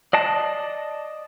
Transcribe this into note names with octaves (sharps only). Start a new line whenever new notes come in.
D5 D#5 A5